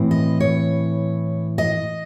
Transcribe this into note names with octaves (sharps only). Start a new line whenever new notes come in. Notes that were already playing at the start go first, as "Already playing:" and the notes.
Already playing: A2 E3 C4
D#5
C#5
D#5